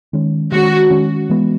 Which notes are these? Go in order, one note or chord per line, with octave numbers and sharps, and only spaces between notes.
D#3 G#3 C#4
D#3 G#3 C#4 F#4
D#3 G#3 C#4
E3 G#3 B3